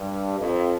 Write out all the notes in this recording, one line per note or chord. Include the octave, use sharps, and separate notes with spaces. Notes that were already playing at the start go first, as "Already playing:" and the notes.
Already playing: G2
F2